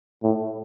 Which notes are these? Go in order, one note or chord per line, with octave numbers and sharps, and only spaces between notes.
A2